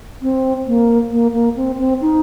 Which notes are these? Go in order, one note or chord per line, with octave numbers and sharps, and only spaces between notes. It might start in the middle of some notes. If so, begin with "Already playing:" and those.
C4
A#3
A#3
A#3
C4
C4
D#4